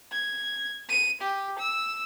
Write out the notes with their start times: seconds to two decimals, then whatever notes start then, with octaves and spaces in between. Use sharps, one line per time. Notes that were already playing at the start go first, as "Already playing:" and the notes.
0.12 G#6
0.89 D#7
1.21 G4
1.59 E6